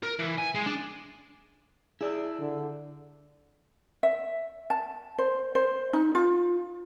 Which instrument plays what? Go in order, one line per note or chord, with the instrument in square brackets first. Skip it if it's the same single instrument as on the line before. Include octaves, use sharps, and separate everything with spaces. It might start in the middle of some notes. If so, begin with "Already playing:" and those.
[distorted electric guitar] A#4
E3
G#5
G#3
D4
[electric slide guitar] E4 D5 [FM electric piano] G#4 A5 E6
[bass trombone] D3
[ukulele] E5
A5
C5
C5
D#4
F4